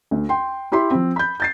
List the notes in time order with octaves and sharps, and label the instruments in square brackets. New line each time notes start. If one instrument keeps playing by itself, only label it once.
[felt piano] D2
G5 C6
E4 G4 B5 C6
F3 C4
B5 G6
G6 A6 C7